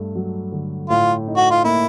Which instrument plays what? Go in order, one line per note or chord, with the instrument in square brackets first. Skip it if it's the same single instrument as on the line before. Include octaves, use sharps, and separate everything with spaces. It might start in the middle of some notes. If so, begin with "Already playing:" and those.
Already playing: [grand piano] G2 A3
F#3
D3
[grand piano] A2 [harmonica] F4
[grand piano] D#4
[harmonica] F#4
F4
[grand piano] A#3 [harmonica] E4